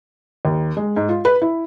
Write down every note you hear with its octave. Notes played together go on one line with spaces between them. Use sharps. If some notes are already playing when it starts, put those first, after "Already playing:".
D#2
G#3
G#2
F4
B4
E4